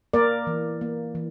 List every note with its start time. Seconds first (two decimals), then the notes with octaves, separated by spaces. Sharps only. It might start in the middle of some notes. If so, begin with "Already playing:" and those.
0.13 A#3 A#4 D5
0.47 E3
0.81 A#3
1.15 E3